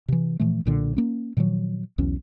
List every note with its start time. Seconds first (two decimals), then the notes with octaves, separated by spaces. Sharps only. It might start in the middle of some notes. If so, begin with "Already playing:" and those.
0.08 C3 E3
0.40 A#2 E3 F3 A3
0.65 B1 A#2 D3
0.97 A#3 C#4
1.37 A#2 D#3 F3 F#3
1.98 B1 E2 B2 C#4